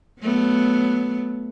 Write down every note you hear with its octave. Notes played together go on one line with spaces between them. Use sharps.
F#3 A3 B3